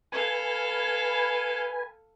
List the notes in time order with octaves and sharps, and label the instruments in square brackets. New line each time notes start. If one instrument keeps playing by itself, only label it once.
[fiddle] A4 F5 [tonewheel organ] B4 G#5